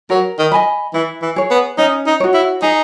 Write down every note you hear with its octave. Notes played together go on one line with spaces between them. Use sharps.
F#3 A#4
D#3
D#5 G#5 B5
E3 E4
E3
G#4 C#5
B3
C#4 D#4
D#4
F#4 C#5
E4
D#4 G#4